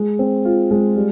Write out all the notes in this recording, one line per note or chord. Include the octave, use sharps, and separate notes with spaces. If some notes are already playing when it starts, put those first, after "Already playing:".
Already playing: G#3
C4
F4
G#3
G3